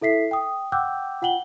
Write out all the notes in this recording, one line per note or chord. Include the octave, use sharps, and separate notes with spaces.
E4 A4 E5 B6 C7
G5 D#6
F#5 G5 D6 E6 F#6 G6
F4 F#5 G5 F#7 G7